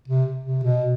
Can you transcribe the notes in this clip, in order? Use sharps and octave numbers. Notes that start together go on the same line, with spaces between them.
C3
C3
B2